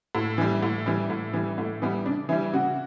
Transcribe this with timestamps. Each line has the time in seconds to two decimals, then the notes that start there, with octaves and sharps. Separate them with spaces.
0.15 A2
0.38 E3 G3
0.63 A2
0.86 E3 G3
1.10 A2
1.33 E3 G3
1.58 A2 A3
1.82 E3 G3 B3
2.06 C#3 D4
2.29 E3 E4
2.32 G3
2.53 C#3 F#4